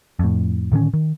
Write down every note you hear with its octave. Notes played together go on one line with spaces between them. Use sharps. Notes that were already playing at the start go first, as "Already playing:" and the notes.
F2 A2
A2 D3 D#3 C#4
D#3